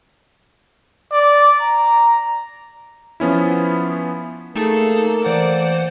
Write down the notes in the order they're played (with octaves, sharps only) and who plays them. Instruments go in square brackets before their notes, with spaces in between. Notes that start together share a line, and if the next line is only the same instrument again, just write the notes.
[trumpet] D5
A#5
[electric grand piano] F3 B3 C#4 E4
[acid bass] A3 [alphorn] A#3 [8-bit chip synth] D#4 G#4 [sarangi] A4
[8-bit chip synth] E3 C5 F#5 [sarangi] D5